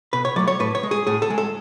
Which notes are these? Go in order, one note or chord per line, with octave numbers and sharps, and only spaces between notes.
B2 B4
C#5
F#3 A3 D5
C#5
A2 B4
C#5
G#3
G#4
A2 G#4
A4
G#3
A4